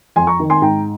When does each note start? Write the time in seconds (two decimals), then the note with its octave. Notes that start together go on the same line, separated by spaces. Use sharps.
0.16 F2 G#5 C6
0.27 A#5 C#6
0.40 D#3
0.50 G#5 C6
0.62 G#2 G5 A#5